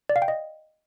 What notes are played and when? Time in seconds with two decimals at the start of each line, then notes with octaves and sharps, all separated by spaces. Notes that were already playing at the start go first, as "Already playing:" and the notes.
0.09 D5
0.16 F5
0.22 G5
0.28 D#5